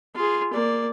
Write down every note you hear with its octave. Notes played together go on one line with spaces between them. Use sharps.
F4 G#4
A#3 D5